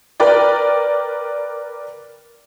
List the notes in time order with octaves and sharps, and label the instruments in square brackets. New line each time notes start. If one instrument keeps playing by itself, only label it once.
[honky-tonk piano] A#4 B4 D5 G5